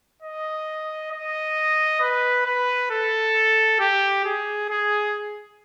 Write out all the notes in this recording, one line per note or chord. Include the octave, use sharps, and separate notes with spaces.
D#5
D#5
B4
B4
A4
G4
G#4
G#4